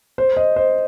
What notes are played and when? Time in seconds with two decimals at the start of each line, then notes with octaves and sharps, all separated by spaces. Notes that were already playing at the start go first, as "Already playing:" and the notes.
0.18 C5
0.37 D#5
0.56 C5